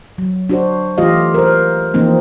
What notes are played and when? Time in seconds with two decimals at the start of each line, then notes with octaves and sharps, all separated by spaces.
0.18 F#3
0.50 D4 F#4 C5
0.98 E3 A3 F4 G4 D#5 F5
1.34 A#4 C5
1.94 E3 F3 A#3 C4 D#4